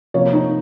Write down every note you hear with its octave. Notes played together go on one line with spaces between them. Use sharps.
C3 F3 A#3 C#5
D#4